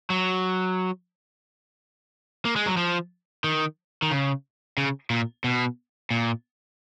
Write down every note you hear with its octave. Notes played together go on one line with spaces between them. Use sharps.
F#3
A#3
G#3
F#3
F3
D#3
D#3
C#3
C#3
A#2
B2
A#2